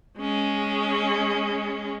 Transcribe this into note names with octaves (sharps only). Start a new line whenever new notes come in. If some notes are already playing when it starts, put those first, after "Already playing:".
G#3 C#4